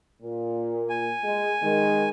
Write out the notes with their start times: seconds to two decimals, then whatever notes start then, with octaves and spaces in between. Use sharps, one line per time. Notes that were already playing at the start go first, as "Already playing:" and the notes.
0.22 A#2
0.89 G#5
1.23 G#3
1.62 D#3 G#3